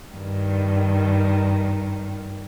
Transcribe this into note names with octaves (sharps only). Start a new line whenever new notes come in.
G2 D#3